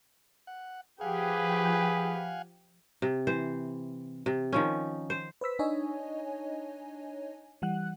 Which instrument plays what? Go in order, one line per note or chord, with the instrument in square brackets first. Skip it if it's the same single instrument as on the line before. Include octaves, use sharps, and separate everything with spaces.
[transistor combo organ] F#5
[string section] F3 G4 [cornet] G#4 [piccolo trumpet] B4 [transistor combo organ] F5 F#5 G#5
[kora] C3
E3 C5
C3
D#3 F3 C#4
C5
[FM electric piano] B4 C5 E6 B6
D4 D#4 C#5 D#5 G#5
E3 G3 F#5 F#6